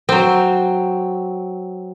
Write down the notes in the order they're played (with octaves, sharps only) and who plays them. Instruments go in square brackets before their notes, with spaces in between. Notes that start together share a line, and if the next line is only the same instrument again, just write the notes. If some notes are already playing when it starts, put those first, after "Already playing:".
[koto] F#3 C4